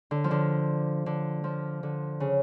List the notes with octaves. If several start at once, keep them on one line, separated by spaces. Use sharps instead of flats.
D3
F3
D3
D3
F3
D3
C#3